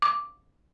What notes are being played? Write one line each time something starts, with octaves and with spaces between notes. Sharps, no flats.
D6